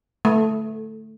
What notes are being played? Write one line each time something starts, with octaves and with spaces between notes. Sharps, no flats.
A3